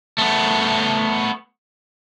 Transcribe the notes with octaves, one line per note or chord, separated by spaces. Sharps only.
A3 B3